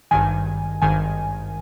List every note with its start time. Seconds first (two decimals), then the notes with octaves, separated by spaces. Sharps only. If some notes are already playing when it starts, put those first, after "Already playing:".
0.11 G#1 G2 D#3 G#5
0.82 G#1 G2 D#3 G#5